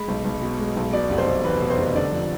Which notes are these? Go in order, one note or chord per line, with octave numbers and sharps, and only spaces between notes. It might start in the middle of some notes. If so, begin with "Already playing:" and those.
Already playing: G#3 B5
B1
B1
B2
G#3
B1
B2 D5
F1
C5
F1
E2 B4
B2
C5
F1
D3 D5
F3